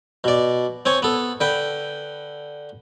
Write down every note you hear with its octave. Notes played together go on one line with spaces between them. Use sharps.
B2 D5
C4 C#5 G#5
B3 A4
D3 B4 G5